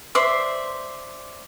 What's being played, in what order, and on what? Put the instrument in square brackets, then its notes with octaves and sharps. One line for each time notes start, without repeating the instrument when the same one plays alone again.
[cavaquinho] C5 D5 E5 C6